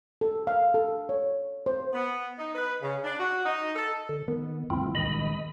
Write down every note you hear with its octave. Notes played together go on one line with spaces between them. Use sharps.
A4
F5
A4
C#5
C5
B3
D#4
B4
C#3
D4
F#4
D#4
A4
D3
D#3 B3
D2 G2 C4 E4 F4
A#2 D#3 G#3 D#5 B5